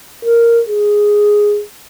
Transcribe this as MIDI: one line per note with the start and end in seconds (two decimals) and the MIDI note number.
0.25 0.61 70
0.69 1.62 68